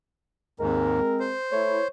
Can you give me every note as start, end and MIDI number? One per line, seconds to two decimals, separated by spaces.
0.60 1.00 39
0.60 1.00 44
0.60 1.34 56
0.60 1.34 60
0.60 1.32 70
1.20 1.88 72
1.52 1.79 57
1.52 1.79 64
1.52 1.87 73